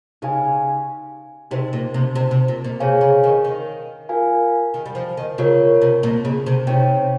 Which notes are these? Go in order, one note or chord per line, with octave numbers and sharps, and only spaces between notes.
C#3 D#4 G4 C5 F5 G#5
C3 D#4 G4 C5
A#2
C3
C3
C3
A#2
A#2
C3 G#4 C#5 F5 G#5
C#3
D#3
D#3
F4 A#4 F5 G#5
D#3
G3
F3
D#3
C#3 F4 A#4 C#5
C3
A#2
C#3
C3
C3 D#4 G4 C#5 G5